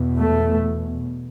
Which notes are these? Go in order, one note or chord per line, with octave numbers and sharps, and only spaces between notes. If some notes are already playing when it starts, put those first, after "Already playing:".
Already playing: E2 B2
A3